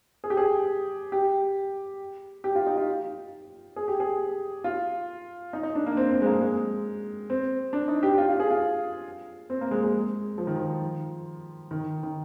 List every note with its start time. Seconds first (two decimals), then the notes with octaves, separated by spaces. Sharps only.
0.24 G#4
0.30 G4
0.37 G#4
1.12 G4
2.44 G4
2.55 F4
2.67 D#4
2.77 F4
3.76 G#4
3.88 G4
4.00 G#4
4.64 F4
5.53 D#4
5.63 D#4
5.75 D4
5.86 A#3
5.97 C4
6.11 C4
6.22 G#3
6.26 A#3
6.41 G#3
7.30 C4
7.73 D4
7.88 D#4
8.03 G4
8.18 F4
8.29 F4
8.40 G#4
8.51 F4
9.50 C4
9.61 A#3
9.71 G#3
9.83 G#3
10.38 F3
10.47 D#3
10.57 F3
11.71 D#3
12.03 D#3